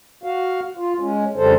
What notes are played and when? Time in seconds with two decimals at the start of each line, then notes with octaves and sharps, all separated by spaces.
0.24 F#4 F5
0.77 F4
1.00 G#3 C#4
1.37 F2 C#3 G3 A4 C5